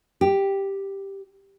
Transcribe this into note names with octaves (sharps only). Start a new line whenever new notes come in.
G4